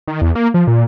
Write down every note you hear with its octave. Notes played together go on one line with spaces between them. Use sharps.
D#3
E2
A#3
F3
A#2